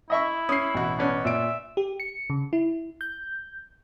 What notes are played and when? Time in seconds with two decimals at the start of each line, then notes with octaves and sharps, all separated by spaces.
0.10 E4 D#5 E5 C#6
0.49 C#4 D#6 C7
0.74 A1 B2 F#4
0.99 B3 C#4 D4
1.25 A#2 E5 D7
1.77 G4
2.00 C#7
2.30 C#3
2.53 E4
3.01 G6